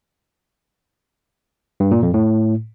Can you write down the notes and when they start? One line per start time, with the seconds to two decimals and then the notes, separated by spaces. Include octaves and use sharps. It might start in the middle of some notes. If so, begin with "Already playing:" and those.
1.80 G2
1.91 A#2
2.03 F2
2.14 A2